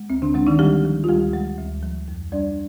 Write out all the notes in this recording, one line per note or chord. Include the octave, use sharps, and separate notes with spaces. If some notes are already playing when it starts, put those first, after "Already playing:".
Already playing: G#3
D2 C4
D3 D4
D3 G#3 D4
D#3 D#4
G3 G#3 G4
F3
F4
D2 G3 G4
G#3
D2
F3
F2
G3 D4 D5